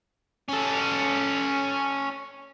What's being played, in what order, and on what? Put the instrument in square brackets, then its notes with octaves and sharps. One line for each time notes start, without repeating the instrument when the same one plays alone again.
[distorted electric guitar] C#4 A4